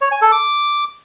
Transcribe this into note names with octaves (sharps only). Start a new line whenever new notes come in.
C#5
G#5
A4
D6